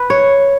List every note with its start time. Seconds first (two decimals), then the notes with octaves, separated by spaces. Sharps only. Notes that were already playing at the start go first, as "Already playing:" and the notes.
Already playing: B4
0.10 C#5